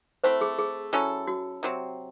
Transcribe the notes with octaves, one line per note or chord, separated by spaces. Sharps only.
A3 C4 E4 C5
G#4
G#4
F#3 C#4 E4 A4
F#4
C3 F#3 C4